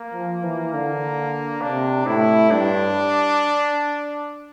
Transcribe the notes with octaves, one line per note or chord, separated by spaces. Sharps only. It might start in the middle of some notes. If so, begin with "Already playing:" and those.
Already playing: A#3
F3
E3
D3 A#3
C3 D4
A2 E4
G2 D4